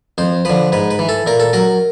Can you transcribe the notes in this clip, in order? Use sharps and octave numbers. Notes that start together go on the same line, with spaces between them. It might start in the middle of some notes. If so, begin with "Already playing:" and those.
F2 C5
D3 F3 B4
G#2 B4
B4
E3
A4
A#2 A#4
A4
F#3 A#4